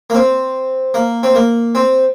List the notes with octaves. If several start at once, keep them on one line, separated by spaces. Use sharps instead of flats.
A#3
C4
A#3
C4
A#3
C4